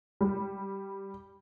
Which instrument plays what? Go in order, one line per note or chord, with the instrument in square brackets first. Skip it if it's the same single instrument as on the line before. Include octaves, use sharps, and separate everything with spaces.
[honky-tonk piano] G3